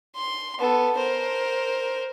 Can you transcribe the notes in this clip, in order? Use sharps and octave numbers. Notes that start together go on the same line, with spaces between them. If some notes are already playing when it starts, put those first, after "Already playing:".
C6
B3 A4
A#4 C5